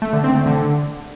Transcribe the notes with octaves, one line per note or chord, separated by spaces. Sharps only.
A3
D3
C4
A3
D3